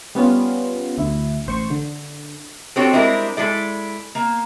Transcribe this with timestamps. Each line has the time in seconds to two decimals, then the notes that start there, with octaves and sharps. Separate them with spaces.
0.15 G3 B3 C#4 F4
0.98 D2 E4
1.46 A1 C5 C#6
1.70 D3
2.76 C4 D4 F#4 G4 A4 C#5
2.93 G3 G#3 C4 D4 E4 A#4
3.37 G#3 E4 A4 D5
4.15 A#3